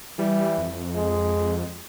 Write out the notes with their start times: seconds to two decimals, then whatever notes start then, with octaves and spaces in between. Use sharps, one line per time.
0.19 E3 G3
0.58 F2
0.96 G#3